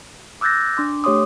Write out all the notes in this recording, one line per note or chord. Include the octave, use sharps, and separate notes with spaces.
D6 E6 F#6 G6 A6 A#6
D4 C6 D6
A3 G4 C#5 C6 D6 D#6